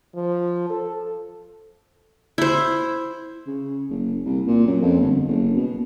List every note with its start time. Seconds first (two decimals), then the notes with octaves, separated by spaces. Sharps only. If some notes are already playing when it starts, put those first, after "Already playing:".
0.16 F3
0.70 A4
2.38 E4 C5
3.47 C#3
3.90 F#1
4.26 C2
4.47 A#2
4.67 F#2
4.82 F2
5.01 G1
5.27 F#1
5.56 B2